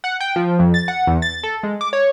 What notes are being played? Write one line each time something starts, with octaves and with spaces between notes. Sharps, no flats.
F#5
G5
F3
F2
A6
F#5
E2
A6
A4
G#3
D6
C#5